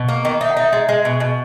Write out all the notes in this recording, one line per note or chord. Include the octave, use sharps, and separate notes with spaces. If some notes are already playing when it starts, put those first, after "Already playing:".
Already playing: B2 F#5
A#3
D#3
D#4 E5
F#5
D#4 E5
G#3 D#5
G#3
B2
B2